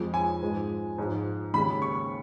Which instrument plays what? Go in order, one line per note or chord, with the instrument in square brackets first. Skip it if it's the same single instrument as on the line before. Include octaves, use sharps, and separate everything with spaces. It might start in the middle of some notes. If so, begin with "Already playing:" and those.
Already playing: [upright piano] F2 F3 G#3
G#5
G#2 F3 G#3
G#2 F3 G#3
D#2 C#3 G#3 B5
C#6